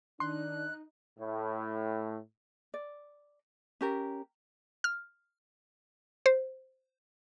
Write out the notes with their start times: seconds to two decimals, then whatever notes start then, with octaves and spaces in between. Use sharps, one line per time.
0.20 D#3 D4 D#4 C6 F#6
1.20 A2
2.74 D5
3.81 C#4 G4 A#4
4.84 F6
6.26 C5